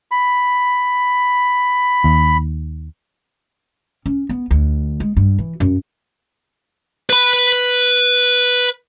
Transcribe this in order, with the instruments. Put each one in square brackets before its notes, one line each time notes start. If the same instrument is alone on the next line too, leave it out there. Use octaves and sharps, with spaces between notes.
[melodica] B5
[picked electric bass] D#2
[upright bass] C#4
B3
D2
G#3
G2
E3
F#2
[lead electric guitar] B4 B5